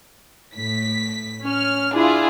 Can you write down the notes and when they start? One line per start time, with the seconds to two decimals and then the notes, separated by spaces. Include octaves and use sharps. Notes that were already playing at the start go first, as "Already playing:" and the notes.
0.55 A2 B6
1.43 C#4 F6
1.95 D4 E4 F4 G#4